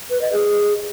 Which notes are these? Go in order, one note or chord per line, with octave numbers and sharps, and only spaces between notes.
B4
D#5
G#4